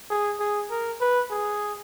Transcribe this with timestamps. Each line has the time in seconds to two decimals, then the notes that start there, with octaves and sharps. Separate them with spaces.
0.10 G#4
0.40 G#4
0.70 A#4
1.01 B4
1.31 G#4